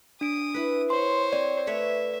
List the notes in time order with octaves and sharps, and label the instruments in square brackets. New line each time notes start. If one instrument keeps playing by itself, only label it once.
[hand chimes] D4 D7 [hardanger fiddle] D#6
[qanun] E4 B4
[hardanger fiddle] C5 C#5 [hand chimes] C6
[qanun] C4 [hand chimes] D5
[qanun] A3 B4 C#5 [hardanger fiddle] E5